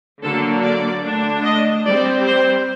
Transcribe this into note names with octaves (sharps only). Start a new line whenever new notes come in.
D3 F#3 A#3 D4 A4
D5
D3 A3 D4
D#5
G3 C4 D5
C5